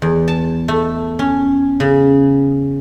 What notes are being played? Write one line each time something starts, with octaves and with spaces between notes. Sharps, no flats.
E2
A5
A3
C#4
C#3